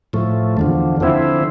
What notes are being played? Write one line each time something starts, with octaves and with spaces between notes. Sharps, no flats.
A2 F3 A3
E2 D3 F3
D3 F3 C4 E4